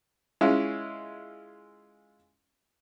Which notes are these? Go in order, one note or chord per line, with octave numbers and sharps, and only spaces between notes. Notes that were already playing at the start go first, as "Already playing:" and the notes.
G#3 C#4 E4 F4